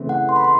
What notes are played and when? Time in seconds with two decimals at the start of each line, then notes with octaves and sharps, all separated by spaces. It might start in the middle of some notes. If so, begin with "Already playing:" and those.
Already playing: C#3 E3 A3 C4
0.09 F#5
0.29 C6
0.36 B5
0.44 C6